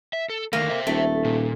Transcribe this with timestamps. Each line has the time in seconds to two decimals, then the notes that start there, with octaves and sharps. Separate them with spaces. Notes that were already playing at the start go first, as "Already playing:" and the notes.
0.13 E5
0.30 A4
0.53 D3 D#3 A3 A#3
0.69 C5 E5
0.87 D#1 A3
1.24 A#2